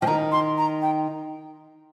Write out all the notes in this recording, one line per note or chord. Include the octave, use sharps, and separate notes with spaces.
F3 G5
D#3 A#5
C6
A#5
G5